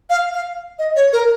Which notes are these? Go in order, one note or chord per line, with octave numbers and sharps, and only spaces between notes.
F5
F5
D#5
C#5
A#4